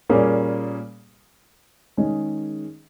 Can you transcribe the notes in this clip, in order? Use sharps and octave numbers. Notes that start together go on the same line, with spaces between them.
A#2 G3 A#3 C#4 G#4
D#3 G#3 C#4 G#4 D#5